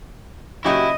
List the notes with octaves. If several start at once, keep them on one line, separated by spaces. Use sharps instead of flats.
A#2 C#3 F#3 E4 F#4 G4 D#5